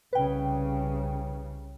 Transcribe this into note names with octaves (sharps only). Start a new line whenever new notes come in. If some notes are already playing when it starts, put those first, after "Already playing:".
C2 C#3 B4 G5